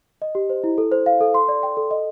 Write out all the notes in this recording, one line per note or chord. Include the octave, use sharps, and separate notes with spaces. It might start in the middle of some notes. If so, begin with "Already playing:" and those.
D#5
G4
C5
E4
A4
C5
F5
A4
C6
D5
G5
A4
D#5